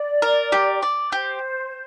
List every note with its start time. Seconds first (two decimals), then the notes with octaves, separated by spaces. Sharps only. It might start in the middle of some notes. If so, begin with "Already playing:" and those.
Already playing: D5
0.22 A#4
0.52 G4
0.82 D5
1.12 G4 C5